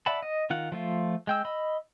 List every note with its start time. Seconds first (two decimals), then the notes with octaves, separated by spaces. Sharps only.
0.06 D5 E5 F#5 A5 B5
0.23 D#5
0.50 D#3 F4 F#5
0.72 F3 A3 F4
1.27 G#3 G5 E6
1.45 D#5 B5 E6